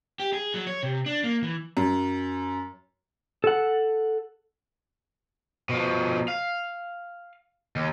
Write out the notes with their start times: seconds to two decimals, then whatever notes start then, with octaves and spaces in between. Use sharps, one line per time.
0.20 G4
0.33 G#4
0.54 F#3
0.67 C#5
0.83 C3
1.06 D4
1.24 A#3
1.43 E3
1.77 F#2
3.44 A4 F#5
5.69 B2 F3
6.28 F5
7.76 D#2